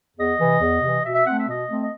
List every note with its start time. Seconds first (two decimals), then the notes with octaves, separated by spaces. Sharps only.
0.17 E2 D#5
0.39 C3 E3
0.60 E2
0.82 C3 E3
1.04 B2 E5
1.15 E5
1.25 A3 C4 F#5
1.37 E5
1.47 B2 D#5
1.69 A3 C4
1.81 D#5